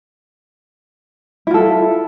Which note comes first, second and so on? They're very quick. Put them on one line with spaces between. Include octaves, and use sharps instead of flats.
E4 F4 A4